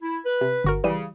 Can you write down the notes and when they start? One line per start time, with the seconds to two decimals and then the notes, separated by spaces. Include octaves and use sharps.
0.02 E4
0.25 B4
0.41 C3
0.64 G1 F#4 A#4
0.84 C#3 E3 G3 D#7